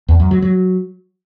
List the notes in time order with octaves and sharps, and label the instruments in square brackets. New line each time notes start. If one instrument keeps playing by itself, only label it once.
[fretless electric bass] E2
F#2
F#3
F#3